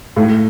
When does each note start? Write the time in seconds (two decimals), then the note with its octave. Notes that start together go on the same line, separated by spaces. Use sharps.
0.16 A2